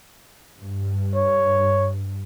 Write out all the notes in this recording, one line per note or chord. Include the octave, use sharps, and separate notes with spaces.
G2
C#5